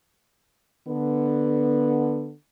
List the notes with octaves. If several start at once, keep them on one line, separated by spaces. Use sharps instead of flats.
D3 B3